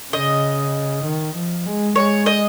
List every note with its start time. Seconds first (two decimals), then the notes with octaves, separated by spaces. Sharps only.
0.13 C#3 D#5
1.04 D#3
1.36 F3
1.66 G#3
1.96 G#3 C#5
2.26 D#5